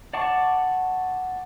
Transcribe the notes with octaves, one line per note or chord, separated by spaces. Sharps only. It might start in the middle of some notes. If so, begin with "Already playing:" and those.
D5 F#5 A5 C#6 D6